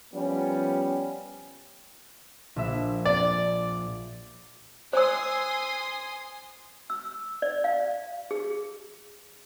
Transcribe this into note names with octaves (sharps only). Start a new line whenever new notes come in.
F3 G3 B3 C#4
A#1 E5
D5
C5 G#5 C6 D#6 E6
E6
D5
F5
G#4